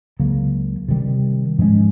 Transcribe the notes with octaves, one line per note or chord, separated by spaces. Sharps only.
C#2 C#3 F#3 A#3
C3 D#3 G3
G#2 F3 G#3 C#4